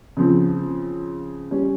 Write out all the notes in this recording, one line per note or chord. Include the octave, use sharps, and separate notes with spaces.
C#3 F3 C4
G3 C#4